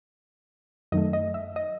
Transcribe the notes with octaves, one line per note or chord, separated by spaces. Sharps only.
F#2 D#3 F#3 A3 D#5
D#5
E5
D#5